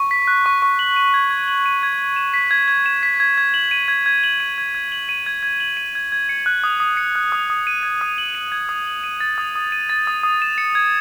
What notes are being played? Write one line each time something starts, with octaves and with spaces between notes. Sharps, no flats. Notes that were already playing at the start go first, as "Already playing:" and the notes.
Already playing: C#6
B6
F#6
C#6
C#6
F#7
D#7
G#6
G#6
F#7
D#7
G#6
G#6
E7
B6
G#6
G#6
E7
B6
G#6
G#6
F#7
D#7
G#6
G#6
F#7
D#7
G#6
G#6
F#7
D#7
G#6
G#6
F#7
D#7
G#6
G#6
C#7
F#6
D#6
D#6
C#7
F#6
D#6
D#6
D#7
G#6
D#6
F#7
D#7
G#6
D#6
F#7
D#7
A6
D#6
D#6
D#7
A6
D#6
D#6
E7
C#7
G#6